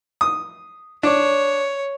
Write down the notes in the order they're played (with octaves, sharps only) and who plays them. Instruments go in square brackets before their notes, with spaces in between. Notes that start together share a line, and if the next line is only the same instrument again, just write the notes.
[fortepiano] D#6
[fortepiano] D4 [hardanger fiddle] C#5